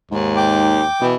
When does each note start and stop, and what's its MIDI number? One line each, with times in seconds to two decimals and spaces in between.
0.11 0.85 39
0.11 0.87 44
0.36 1.06 79
0.36 1.06 86
1.02 1.16 47
1.02 1.15 52